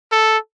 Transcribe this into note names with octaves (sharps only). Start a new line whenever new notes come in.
A4